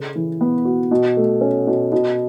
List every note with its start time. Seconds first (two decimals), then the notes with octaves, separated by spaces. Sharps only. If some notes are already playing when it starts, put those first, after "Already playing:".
Already playing: C#3 A4
0.16 E3
0.41 B3
0.65 F#4
0.91 B2
1.17 A3
1.41 C#4
1.67 B2
1.92 B2